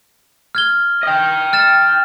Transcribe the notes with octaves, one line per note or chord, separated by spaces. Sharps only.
F6 G#6 G7
D#5 G5
F6 A6 E7